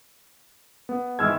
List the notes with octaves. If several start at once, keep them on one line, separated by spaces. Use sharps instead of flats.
B3
G#2 D#3 E3 E6 F6 G#6